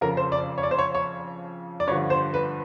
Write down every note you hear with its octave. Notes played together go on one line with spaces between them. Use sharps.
F2 C#3 F3 A#4
C5
D5
C#5
D5
C5
C#5
C#5
D5
G2 D3 F3 C#5
C5
B4